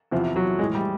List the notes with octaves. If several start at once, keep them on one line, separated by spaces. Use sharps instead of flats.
E2 C3 E3 F3
F#3
A2 E3 G#3
G3